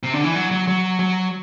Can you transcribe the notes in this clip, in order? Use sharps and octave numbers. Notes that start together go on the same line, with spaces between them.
C3
D3
E3
F#3
F#3
F#3
F#3